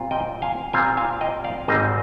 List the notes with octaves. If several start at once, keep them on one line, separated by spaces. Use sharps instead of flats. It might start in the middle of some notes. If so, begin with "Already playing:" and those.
Already playing: A#2 G3 C4 F4
D#5 G5
F5 G#5
A#2 G3 C4 F4 F5 G#5
F5 G#5
D#5 G5
D5 F5
G#1 G#2 G3 C4 C5 D#5